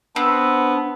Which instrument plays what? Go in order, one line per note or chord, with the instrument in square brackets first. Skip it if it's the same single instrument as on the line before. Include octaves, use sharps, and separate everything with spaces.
[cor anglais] B3 [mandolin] C4 [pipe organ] D4